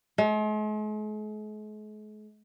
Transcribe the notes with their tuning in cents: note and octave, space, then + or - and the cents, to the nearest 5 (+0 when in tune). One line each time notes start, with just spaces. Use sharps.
G#3 +45